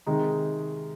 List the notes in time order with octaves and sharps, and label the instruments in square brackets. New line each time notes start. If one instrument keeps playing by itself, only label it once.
[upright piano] C3 D#3 G#3 D#4